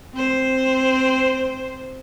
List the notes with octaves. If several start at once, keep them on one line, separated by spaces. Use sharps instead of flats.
C4 C5